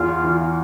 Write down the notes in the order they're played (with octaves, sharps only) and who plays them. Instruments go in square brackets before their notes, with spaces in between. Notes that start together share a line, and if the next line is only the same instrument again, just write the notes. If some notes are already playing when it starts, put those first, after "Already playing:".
Already playing: [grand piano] E2 [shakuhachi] F4
[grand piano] E3